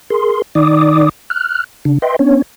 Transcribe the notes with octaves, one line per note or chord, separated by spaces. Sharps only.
G#4 A#4 C6
D#3 D#4 D5 D6 D#6
F6 F#6
C#3 D4
B4 D#5 E5 G5 C6
B3 C#4 D4 C#5